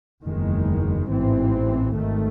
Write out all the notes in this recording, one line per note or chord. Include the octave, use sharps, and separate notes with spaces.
F#1 E2 D#3 G#3
A1 G#2 E3 C4
G#1 G#2 D#3 A3